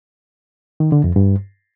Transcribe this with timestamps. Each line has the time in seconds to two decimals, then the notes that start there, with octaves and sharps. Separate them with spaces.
0.80 D#3
0.92 D3
1.04 F2
1.16 G2